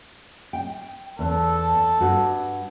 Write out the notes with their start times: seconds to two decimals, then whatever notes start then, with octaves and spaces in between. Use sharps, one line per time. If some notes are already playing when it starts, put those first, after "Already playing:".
0.53 G5
1.19 E2 A4
2.01 G2 F#4